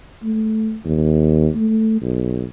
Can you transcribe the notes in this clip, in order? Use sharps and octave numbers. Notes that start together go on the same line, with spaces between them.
A3
D#2
A3
B1